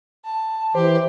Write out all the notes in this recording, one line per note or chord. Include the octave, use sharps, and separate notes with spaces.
A5
E3 G4 C5